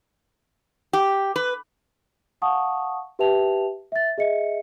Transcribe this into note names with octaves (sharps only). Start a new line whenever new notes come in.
G4
B4
F5 F#5 A5 C#6 D#6
G4 B4 E5 G5 A5 F7
E5 A6
G#4 D#5 E5 C#7